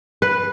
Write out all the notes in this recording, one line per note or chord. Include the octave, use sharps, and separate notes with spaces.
B4